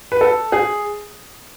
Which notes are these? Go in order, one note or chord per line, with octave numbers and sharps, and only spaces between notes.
B4
A4
G#4